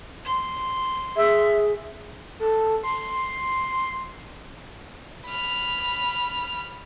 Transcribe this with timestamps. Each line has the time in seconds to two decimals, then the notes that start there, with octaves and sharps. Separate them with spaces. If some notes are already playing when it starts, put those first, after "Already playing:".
0.25 C6
1.16 G#4 E5
2.39 A4
2.84 C6
5.26 B5 F6